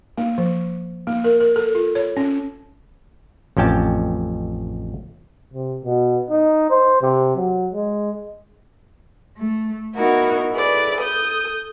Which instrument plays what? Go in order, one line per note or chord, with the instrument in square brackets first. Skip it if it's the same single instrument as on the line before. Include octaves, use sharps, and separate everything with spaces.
[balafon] A#3
F3
A#3
A#4
A#4
A4
F4
C#5
C#4
[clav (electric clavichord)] A1 F2 C#4 G5 A5
[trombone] C3
B2
D#4
C5
C3
F#3
G#3
[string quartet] A3
B3 D#4 E4 F#4 A#4
E4 G#4 A4 B4 D5
A4 D#6 G6